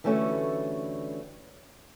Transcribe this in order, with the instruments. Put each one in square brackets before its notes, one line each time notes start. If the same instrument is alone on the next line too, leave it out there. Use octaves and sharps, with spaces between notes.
[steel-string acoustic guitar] D3 E3 G3 A3 C#4 F#4